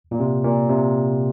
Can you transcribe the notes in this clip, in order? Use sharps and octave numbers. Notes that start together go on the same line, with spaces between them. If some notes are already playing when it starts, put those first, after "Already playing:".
A#2
C3
A#2
C3